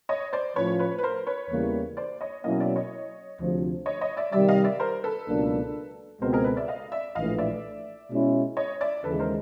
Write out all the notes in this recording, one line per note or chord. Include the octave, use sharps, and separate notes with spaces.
C#5 D#5
C5 D5
A2 F3 A3 C#4 F4 B4 C#5
B4 C#5
B4
A#4 C5
B4 C#5
E2 C#3 E3 G3 A#3
C5 D5
C#5 D#5
B2 F#3 A#3 C#4 E4 D#5 F5
D5 E5
C#5 D#5
D2 C3 F3
C#5 D#5
C#5 D#5
D5 E5
C3 D#3 G3 D5 E5
D#5 F5
D5 E5
A#4 C5
A4 B4
C#2 B2 F#3 A#3 D4
C#2 B2 G#3 C4 A#4 C5
G#4 A#4
A4 B4
D5 E5
D#5 F5
D5 E5
A#1 A2 E3 A3 D#5 F5
D5 E5
B2 G#3 C#4 E4
C#5 D#5
D5 E5
D#2 C#3 E3 G#3 A4 B4
A#4 C5